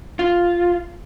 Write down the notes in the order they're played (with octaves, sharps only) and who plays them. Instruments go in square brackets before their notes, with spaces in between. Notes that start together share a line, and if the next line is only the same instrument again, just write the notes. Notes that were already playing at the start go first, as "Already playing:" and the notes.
[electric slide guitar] F4